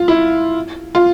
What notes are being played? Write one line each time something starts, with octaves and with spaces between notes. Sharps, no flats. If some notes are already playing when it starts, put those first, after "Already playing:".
Already playing: F4
E4
F4